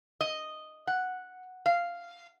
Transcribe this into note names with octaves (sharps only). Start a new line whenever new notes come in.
D#5
F#5
F5